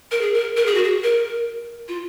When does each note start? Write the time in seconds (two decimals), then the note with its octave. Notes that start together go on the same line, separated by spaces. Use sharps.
0.11 A#4
0.21 G#4
0.34 A#4
0.57 A#4
0.66 G#4
0.74 F#4
0.84 G#4
1.04 A#4
1.88 F4